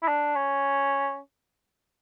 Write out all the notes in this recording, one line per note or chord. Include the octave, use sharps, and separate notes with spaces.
E4
D4
C#4